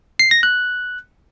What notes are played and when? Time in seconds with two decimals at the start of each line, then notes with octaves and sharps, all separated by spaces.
0.19 C7
0.31 A#6
0.43 F#6